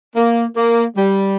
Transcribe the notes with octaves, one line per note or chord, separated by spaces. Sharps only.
A#3
A#3
G3